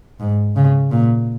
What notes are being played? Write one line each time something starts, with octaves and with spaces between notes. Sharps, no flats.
G#2
C#3
A#2